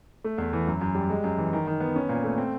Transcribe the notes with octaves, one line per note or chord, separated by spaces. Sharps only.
A3
E2
E3
F#2
F#2
G3
G#3
F#2
E3
D#3
D#3
B3
C#4
A#2
A3
C4